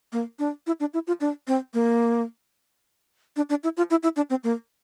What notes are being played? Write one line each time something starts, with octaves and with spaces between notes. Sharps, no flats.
A#3
D4
E4
D4
E4
F4
D4
C4
A#3
D4
D4
E4
F4
E4
E4
D4
C4
A#3